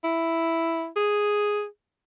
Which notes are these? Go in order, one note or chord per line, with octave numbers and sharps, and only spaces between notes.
E4
G#4